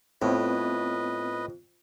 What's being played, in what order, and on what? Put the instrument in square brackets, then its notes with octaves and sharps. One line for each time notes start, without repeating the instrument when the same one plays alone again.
[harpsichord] F2 [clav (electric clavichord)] A2 [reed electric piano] B3 C4 [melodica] B4 D#5